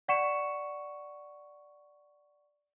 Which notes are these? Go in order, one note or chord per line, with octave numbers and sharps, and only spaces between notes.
D5 F#5 C#6 C#7 E7